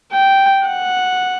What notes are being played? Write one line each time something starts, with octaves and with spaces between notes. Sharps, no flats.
G5
F#5